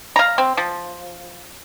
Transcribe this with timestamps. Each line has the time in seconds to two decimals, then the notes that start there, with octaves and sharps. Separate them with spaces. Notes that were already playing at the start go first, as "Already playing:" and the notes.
0.16 F5 A#5
0.38 C4
0.57 F3